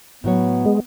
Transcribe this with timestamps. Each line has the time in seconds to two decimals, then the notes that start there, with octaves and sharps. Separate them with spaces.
0.24 A2 F#3 B3 C#5
0.65 G#3